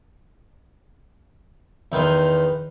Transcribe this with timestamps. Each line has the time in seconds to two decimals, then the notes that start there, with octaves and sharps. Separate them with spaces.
1.92 E2 D#3 B4 C5